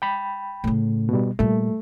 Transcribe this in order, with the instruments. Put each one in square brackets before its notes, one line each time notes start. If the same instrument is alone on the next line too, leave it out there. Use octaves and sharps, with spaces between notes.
[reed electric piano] G5 B5
[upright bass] A2 C#3
[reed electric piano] B2 G3
[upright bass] A#2 G3 [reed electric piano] A3